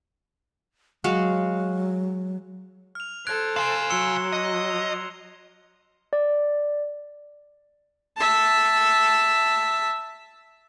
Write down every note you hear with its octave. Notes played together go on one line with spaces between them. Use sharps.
F#3 G#3 F#4 F5
F6 F7
A4 C5 F#6 G#6 D7
F5 G#5 C6 C7 E7
F#3 C6 E6 C#7 G7
D#5
F7
D5
E5 A5